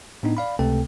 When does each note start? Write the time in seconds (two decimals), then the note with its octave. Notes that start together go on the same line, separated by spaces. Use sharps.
0.23 A2 B3 D4 D#4
0.37 D5 F5 B5
0.59 C#2 C3 A3 C4 A4 G5